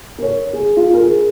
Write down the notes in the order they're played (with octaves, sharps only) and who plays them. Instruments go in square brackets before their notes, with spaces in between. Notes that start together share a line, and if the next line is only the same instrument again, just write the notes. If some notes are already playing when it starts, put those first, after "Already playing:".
[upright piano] A#4
C#5
G#4
F4
A#4
G#4